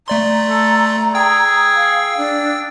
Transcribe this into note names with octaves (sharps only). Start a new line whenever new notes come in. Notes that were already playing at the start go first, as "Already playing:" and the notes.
A3 D5 A#5 C6
A4
G#4 G5 E6
F5
D4